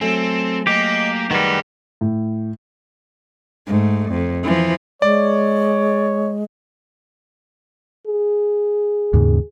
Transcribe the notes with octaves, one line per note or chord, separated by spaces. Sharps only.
F#3 A3 C4 A4 G#5
A#3 G4 D#5
D#3 G3 G#4 B4 F#5
A2
G#2 A3
F2
E3 F3
G#3 C#5 D5
G#4
D#2 G#2 C#3